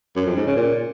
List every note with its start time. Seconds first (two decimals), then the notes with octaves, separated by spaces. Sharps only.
0.16 F#2
0.26 F2
0.36 G#2
0.46 C#3
0.56 A#2